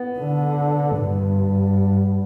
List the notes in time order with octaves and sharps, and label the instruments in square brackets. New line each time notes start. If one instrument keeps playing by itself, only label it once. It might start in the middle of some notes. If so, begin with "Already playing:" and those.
Already playing: [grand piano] B3
[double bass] D3
G2